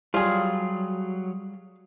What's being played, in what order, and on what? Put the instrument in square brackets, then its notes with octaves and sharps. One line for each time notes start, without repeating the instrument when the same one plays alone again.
[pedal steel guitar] F#3 [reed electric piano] G3 [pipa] F4 G#4